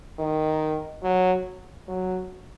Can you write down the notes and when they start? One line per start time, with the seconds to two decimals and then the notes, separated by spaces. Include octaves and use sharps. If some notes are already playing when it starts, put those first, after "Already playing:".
0.19 D#3
1.03 F#3
1.88 F#3